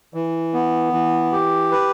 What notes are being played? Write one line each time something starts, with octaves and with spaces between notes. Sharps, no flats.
E3
B3
E3
G4
B4